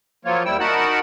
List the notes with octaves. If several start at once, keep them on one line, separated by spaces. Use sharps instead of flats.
F3 F#3 A#3 F4 C#5
D#2 G3 E4 G5 E6
D#4 F#4 A#4 F#5 A5 B5